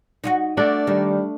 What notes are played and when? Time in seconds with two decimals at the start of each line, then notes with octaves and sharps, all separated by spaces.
0.24 D#4 E4 F#4
0.57 A3 D4 F#4 D5
0.87 D#3 G3